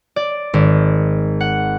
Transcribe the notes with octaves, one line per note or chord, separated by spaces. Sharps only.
D5
G#1
F#5